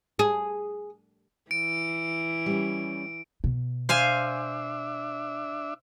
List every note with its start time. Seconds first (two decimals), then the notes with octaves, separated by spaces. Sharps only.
0.19 G#4
1.51 E3 D7
2.46 G3 C#4
3.44 B2
3.89 D4 C5 E5 F5 G#5